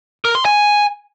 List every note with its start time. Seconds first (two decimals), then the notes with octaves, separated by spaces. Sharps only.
0.25 A#4
0.35 C6
0.45 G#5